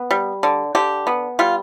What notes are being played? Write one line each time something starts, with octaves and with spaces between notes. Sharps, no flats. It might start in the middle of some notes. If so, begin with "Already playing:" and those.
Already playing: B3
G3
D3
D3 G4
B3
G3 F4